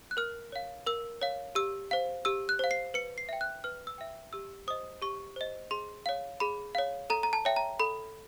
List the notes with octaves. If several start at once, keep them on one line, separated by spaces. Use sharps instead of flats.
F#6
A#4 F6
C#5 F5
A#4 E6
C#5 F5
G4 E6
C5 F5
G4 E6
F#6
C5 F5
C7
B4 C#7
C7
E5 G5
F#6
B4 F6
E6
E5 G5
G4 E6
C5 D#5 D#6
G4 C#6
C5 D#5
G#4 C6
C#5 F5
G#4 B5
C#5 F5
A4 A#5
A#5
A5
C#5 E5 G5
A#5
A4 B5